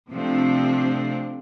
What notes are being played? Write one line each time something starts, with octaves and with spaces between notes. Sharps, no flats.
C3 F3 A3 C4 D4